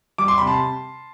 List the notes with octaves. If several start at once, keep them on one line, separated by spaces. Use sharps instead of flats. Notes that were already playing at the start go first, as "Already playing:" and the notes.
G3 D6
C6
C3 B5
A5 C6